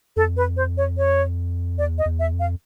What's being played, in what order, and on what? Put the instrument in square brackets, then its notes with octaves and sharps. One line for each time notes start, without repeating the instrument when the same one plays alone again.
[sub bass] F2 [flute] A4
[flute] B4
C5
C#5
C#5
[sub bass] E2 [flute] D5
[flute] D#5
[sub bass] E2
[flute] E5
[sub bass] F2
[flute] F5